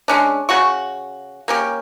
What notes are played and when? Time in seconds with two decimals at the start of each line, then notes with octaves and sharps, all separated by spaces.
0.08 G#3 C#4 D4
0.49 C#3 F#4 C#6
1.48 A#3 C#4 G4